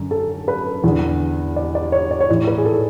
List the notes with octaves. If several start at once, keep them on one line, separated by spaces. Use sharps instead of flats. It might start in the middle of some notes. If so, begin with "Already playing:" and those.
Already playing: F#2 D3
A4
B4
E2 D3
D5
D5
C#5
D5
C#5
A2 E3 D5
B4
G#4
A4